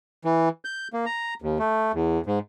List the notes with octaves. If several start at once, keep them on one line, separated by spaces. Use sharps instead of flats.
E3
G6
A#3
A#5
D#2
A3
E2
G#2